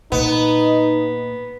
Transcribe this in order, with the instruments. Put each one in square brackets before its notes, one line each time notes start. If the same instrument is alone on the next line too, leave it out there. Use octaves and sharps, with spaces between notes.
[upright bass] A#2 [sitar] B3 [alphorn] D#4